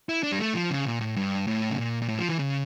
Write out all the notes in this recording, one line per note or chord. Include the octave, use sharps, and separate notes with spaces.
E4
D4
G3
A3
F3
C#3
A#2
A2
G2
A2
C#3
A#2
A#2
A2
F3
E3
C#3